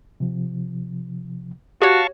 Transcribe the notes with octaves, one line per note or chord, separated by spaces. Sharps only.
C3 F3
F#4 G4 C#5 F5 A5 C#6